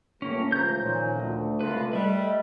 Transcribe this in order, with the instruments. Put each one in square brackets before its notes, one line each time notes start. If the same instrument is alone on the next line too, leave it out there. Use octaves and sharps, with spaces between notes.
[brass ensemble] G1 A2 [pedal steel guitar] A#3 C#4
[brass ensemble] C#2 E3 A3 [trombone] F3 [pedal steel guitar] A#5 G6
[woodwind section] A#2 [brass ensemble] D#3 C#4
[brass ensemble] D2 [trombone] A3
[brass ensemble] C2 [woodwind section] C#3 G#3 F4 [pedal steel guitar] B4
[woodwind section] G3 [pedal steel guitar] B4 E5 [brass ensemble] D#5